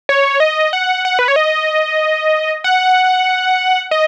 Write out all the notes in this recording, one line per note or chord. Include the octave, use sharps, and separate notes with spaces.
C#5
D#5
F#5
F#5
B4
C#5
D#5
F#5
D#5